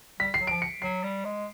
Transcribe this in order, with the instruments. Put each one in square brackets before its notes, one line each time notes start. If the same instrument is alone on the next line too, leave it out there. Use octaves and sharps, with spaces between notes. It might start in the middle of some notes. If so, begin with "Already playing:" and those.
[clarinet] G3 [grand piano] B6
[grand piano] C7
[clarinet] F#3
[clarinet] F3 [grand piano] D7
[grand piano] C#7
[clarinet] F#3 [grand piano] C7
[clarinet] G3
G#3